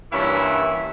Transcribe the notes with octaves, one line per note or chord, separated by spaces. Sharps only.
G2 A#2 E3 C#4 E5